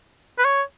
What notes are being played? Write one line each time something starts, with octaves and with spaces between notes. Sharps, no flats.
B4
C#5